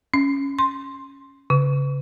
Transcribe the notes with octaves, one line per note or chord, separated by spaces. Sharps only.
C#4
C6
C#3